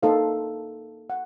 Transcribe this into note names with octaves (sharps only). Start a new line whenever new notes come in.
A#3 D#4 A4 C5 F5
F#5